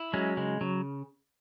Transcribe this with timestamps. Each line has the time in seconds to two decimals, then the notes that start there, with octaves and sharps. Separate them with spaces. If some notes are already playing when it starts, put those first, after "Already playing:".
Already playing: E4
0.13 F#3 G#3 C#4
0.37 C#3 G#3
0.61 C#3 F#3